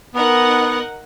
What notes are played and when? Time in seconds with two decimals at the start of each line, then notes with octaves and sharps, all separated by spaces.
0.14 B3 D#4 A#4 F#5